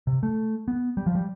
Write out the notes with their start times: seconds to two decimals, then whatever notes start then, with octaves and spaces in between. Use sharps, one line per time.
0.07 C3
0.23 A3
0.68 B3
0.97 G3
1.06 F3
1.15 G3